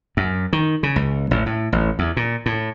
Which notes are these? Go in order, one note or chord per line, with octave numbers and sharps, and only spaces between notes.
F#2
D#3
C#3
C#2
A1
A2
A1
E2
A#2
A2